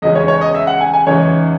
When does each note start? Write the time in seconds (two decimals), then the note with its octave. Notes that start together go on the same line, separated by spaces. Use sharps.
0.02 E2 C#3 G#3 C#4 D#5
0.15 C#5
0.28 C#5
0.41 D#5
0.55 E5
0.67 F#5
0.81 G#5
0.93 G#5
1.06 E2 C#3 E3 G#3 D#4 C#5